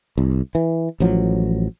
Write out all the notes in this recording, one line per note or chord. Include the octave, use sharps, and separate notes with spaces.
C2
E3
A1 F3 F#3